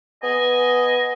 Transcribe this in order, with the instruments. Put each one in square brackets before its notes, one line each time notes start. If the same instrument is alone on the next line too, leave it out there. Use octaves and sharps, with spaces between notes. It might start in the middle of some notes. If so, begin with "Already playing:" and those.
[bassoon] B3 [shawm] D#5 [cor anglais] G#5